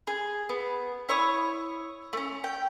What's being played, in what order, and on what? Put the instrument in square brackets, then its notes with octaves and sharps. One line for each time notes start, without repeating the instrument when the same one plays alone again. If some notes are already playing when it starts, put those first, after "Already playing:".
[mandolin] G#4
B3
E4 C#5 C#6 D#6
A3 C#4
G5